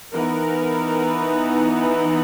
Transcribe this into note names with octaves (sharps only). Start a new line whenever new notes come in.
E3 B3 D#4 A#4
E5